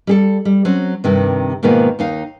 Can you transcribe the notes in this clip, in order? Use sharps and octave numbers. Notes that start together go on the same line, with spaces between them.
G3 G#4 A4
G3
F#3 C4 C#4
G2 C3 D#3
G#2 B2 D#3 A#3 B3 F4
D#2 D#4 F5